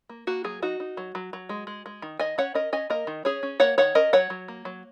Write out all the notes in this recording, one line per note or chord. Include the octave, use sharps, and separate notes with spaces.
A#3
A#3 F#4
F#3 G#4
D#4 F#4
D#4
F#3
F#3
F#3
G#3
G#3
G#3
D#3
D#3 D#5 G#5
C#4 C#5 F#5
C#4 A#4 D#5
C#4 D#5 G#5
A#3 A#4 D#5
D#3
C#4 G#4 C#5
C#4
A#3 C#5 F#5
D#3 C#5 F#5
C#4 A#4 D#5
F#3 C#5 F#5
F#3
A#3
F#3